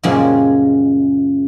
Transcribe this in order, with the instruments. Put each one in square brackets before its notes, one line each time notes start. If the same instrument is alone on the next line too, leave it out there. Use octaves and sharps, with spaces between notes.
[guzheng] F#2 A#2 C#3 F3 G3 G#3